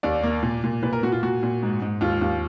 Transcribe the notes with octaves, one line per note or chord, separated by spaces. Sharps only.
D#2 D5
A#3
A#2
A#2
A#2 B4
A#4
A#2 F#4
F4
A#2 F#4
A#2
G#2
G#2
D#2 F4
D#2